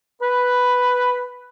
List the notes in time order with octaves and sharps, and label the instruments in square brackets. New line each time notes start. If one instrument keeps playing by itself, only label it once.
[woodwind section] B4